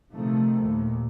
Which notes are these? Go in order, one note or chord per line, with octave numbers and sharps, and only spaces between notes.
C3 D#3 F3 A3
D#2 A#2